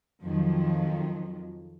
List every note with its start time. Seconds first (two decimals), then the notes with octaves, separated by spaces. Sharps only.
0.22 F2 D#3 F3 F#3